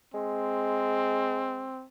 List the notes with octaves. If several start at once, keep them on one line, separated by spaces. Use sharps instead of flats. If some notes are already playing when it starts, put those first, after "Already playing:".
G#3 C4